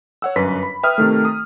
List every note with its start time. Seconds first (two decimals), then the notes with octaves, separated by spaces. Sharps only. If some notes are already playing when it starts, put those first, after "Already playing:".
0.22 C#5 F#5 E6
0.36 G1 F#2 B4 B6
0.63 B5
0.83 B4 E5 G5 D#6 F6
0.98 C3 D#3 A3
1.25 D#6